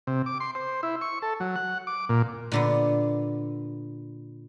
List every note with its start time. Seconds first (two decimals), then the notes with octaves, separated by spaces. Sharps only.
0.07 C3
0.26 D6
0.40 C6
0.55 C5
0.83 E4
1.01 C#6
1.22 A4
1.40 F#3
1.56 F#5
1.87 D6
2.09 A#2
2.52 A#2 D3 B3